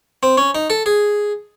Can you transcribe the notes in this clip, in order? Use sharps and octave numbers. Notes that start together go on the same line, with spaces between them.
C4
C#4
D#4
A4
G#4